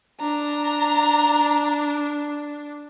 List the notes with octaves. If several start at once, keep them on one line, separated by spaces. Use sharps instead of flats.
D4 A#5